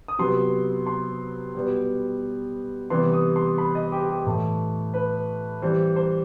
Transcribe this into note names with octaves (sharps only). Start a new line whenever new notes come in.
D#6
C3 F#3 B3 C6
C6
B2 G3 B3
C3 E3 G3 B3 C6
D#6
C6
B5
D#5
G4
G4
A2 E3 A3
B4
E3 G3 C4 C5
C5